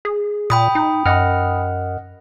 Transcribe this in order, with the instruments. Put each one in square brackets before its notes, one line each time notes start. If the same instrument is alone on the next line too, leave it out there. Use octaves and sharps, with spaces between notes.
[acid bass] G#4
[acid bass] A#2 [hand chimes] G5 B5 D#6
[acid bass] D#4
[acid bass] F#2 [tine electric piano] D#5 F#5 F6